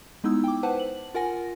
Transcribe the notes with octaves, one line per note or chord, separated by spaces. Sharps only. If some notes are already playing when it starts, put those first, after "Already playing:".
G#3 B3 D#4 E4 E6
G5 D6
B4 C5 F#5 A5
F#7
F4 A#4 F#5 G#5 A#6